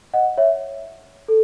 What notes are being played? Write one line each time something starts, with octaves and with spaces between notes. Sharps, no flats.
D#5 F#5
C#5 E5
A4